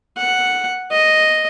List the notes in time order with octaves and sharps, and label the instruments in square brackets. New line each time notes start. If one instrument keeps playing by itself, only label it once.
[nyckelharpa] F#5
D#5